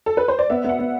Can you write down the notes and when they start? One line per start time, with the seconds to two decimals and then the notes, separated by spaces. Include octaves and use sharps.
0.06 A4
0.17 B4
0.28 C5
0.39 D5
0.50 B3 E5
0.64 B3 F#5
0.79 B3